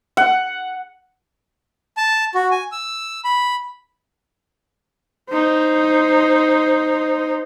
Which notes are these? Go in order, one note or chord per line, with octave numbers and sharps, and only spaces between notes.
F#5
A5
F#4
G#5
E6
B5
D#4 C5